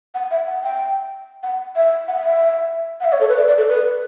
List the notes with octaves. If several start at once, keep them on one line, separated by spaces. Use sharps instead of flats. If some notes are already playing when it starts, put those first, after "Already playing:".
F#5
E5
F#5
G5
F#5
E5
F#5
E5
F#5
E5
C#5
A4
B4
D5
D5
A4
B4